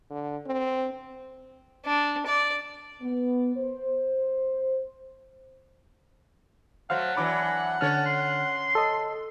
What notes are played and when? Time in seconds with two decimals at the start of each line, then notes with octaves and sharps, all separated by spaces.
0.10 D3
0.47 C4
1.86 D4
2.27 D5
3.02 B3
3.56 C5
6.90 F#3 A3 C5 F5 F#5
7.17 E3 F#3 D4 B5 D6
7.81 D3 C#4 C#5 A5 F6
8.06 C6
8.75 A4 D#5